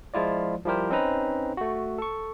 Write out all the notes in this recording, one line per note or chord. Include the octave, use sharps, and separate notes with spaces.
F3 G#3 E4 F4 D5
F3 G3 E4 G4 A#4 C5
C4 C#4 D#4 B4 A#5
A3 F#4
A4 C#6